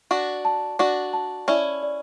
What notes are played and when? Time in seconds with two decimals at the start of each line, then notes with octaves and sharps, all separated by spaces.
0.11 D4 F#4 D5
0.45 A5
0.79 D4 F#4 D5
1.13 A5
1.48 C#4 E4 D5
1.83 D5